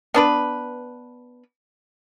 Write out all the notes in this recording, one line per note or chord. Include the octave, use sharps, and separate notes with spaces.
B3 D4 B4